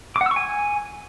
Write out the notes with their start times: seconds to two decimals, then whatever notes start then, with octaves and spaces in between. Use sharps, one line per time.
0.16 D6
0.21 F#5
0.26 E6
0.31 C#6
0.36 G#5